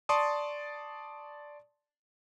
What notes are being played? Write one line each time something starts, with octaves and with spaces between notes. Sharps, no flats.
D5 A5 C6 C#6 D#6